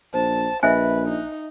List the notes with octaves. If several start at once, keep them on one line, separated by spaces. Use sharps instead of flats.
A#1 C5 A5
A#1 B4 D#5 E5 G#5 F#6
D#4